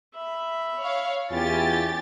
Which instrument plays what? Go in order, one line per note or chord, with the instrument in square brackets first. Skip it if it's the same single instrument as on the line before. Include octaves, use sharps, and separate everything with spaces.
[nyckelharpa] E5 B5
[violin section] C#5 F5
[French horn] E2 [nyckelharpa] C#4 [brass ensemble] E4 F4 G#5 [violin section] G4 A6